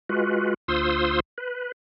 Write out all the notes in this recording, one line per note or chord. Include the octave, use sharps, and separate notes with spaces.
G#3 F4 F#4 B4
D2 F4 C5 C6 D#6 E6
B4